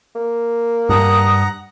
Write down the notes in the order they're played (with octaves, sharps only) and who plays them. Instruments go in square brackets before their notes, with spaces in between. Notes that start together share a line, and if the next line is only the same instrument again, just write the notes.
[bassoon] A#3
[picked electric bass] G2 [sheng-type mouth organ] F#5 A#5 [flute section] D#6